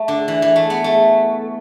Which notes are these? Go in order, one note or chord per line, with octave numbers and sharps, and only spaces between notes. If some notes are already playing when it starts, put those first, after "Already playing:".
Already playing: A3
D3
E3
E3
A3
B3
A3